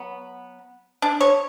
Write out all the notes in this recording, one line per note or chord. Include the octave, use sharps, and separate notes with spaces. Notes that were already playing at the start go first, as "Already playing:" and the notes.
Already playing: F#3 B3
D4
C#5